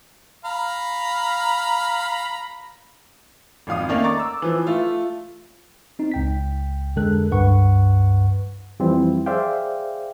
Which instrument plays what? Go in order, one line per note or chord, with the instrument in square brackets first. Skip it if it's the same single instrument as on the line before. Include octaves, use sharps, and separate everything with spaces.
[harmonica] F5 A#5 B5
[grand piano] G#1 F2 F5 D#6
D#3 A3 A#3 C#4 C#5 D5
A#5 C#6 D6 A6
E6
E3 F3
A3 F4
[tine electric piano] C4 D#4
C#2 G5 B6
F2 D3 G#3 A4 A#4 F#6
C#2 G2 B4 F#5 C#6
[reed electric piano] F2 E3 F3 G3 C4 E4
G#4 C5 D5 E5 F5 G5